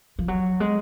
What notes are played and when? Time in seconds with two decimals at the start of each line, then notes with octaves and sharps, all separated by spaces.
0.19 F3
0.28 F#3
0.60 G#3